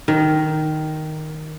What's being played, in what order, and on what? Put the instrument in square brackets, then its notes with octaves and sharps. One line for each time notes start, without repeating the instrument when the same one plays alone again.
[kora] D#3